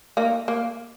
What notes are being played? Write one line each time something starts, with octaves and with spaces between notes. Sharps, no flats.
A#3 D#4
A#3